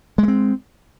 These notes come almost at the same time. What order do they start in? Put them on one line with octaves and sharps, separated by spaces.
G#3 A3 C4